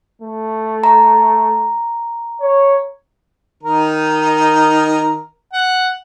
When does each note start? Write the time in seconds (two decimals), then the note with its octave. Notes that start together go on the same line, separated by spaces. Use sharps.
0.22 A3
0.84 A#5
2.41 C#5
3.63 D#3 D#4 A#4
5.53 F#5